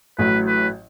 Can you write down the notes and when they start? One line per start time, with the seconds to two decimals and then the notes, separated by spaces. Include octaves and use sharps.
0.18 A1 A2 F#3 B4
0.47 B4